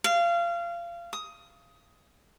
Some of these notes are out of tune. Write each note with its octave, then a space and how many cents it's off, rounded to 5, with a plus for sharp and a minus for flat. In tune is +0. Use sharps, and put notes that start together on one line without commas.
F5 -25
D#6 +15